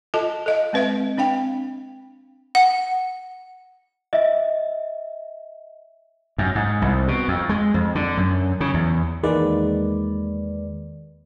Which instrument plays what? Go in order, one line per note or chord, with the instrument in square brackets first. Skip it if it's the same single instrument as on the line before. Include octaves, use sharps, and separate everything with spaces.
[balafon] F4 A4 D#5 A5
A4 D#5 F5
G#3 C4 B4 D#5 E5
C4 D4 F5 G5
[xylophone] F#5
[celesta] D#5 E5
[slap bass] F#2
G#2
C2
B2
F2
G#3
F2
D3
F#2
C#3
E2
[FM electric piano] E2 D#3 G#3 A#3 B4 D5